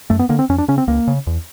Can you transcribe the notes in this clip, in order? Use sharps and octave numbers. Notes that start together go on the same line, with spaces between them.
F#2 A3
B3
D3 A#3
C4
F2 C#4
D4
C#3 C#4
C4
C#2 A#3
C#3
E2